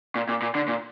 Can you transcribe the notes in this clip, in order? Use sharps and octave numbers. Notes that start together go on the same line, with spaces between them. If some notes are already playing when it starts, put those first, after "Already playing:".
A#2
A#2
A#2
D3
A#2